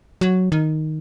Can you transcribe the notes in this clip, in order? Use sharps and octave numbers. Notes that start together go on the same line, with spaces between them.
F#3
D#3